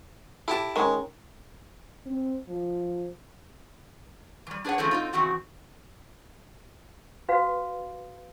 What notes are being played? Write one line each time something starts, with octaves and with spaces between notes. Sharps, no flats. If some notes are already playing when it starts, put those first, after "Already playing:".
E4 G4 A4 A5
D#3 G#3 C#4
C4
F3
E3 G3
D4 G#4 B4 C#5 F#5
A2 C#3 F3 G#3 A3 C4
C4 D#4 F4
C#3 E3 C4 F#4 F#5
F#4 B4 F5